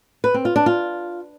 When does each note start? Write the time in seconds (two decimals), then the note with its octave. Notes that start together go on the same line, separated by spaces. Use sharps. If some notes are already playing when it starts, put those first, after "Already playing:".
0.24 B4
0.34 C4
0.45 F4
0.56 D4
0.66 F4